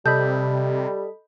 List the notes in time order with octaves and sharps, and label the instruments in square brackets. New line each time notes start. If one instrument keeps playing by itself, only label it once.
[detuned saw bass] C3 [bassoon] G3 [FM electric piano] A4 D#5 B5 [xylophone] G6